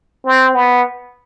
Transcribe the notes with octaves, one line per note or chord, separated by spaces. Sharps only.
C4
B3